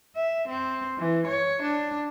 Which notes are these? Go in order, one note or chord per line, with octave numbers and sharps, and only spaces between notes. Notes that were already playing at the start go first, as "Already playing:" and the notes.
E5
C4
E3
C#5
D4